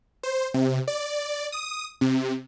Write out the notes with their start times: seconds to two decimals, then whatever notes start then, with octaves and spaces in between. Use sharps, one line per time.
0.23 C5
0.54 C3
0.88 D5
1.52 D#6
2.01 C3